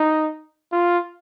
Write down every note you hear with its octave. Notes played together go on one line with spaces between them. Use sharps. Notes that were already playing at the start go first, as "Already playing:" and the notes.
Already playing: D#4
F4